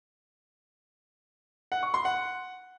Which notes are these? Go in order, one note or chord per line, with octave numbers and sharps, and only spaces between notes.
F#5
C#6
C6
F#5